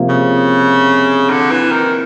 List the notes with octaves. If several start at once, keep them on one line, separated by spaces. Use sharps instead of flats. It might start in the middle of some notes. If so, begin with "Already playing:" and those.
Already playing: C3 F3 A#3
C#3
D3
E3
D#3